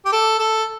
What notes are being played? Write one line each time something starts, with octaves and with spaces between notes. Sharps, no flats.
G4
A4
A4